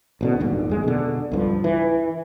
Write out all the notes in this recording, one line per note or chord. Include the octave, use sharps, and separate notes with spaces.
A1 B2 D3
D1 G1 D#2 D4
F2 G#3
B2 D3
C#2 G2 F3
E3